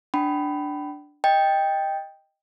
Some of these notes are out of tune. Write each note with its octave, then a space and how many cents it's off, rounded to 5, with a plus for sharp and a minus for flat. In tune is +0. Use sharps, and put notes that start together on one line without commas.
D4 +0 G5 -35 B5 +10
D#5 +5 G5 +10